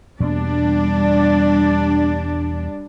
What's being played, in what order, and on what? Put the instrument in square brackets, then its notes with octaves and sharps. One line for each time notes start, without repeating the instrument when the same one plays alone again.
[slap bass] E2 B2 A#3 [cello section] G3 D4 D5